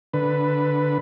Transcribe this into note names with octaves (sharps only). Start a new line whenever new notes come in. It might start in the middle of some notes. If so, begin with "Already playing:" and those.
D3 B4